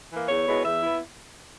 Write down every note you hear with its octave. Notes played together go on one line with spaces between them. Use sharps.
E3 A#3
E2 C#5
B2 G#3 B3 E4
E2 E5
B3 E4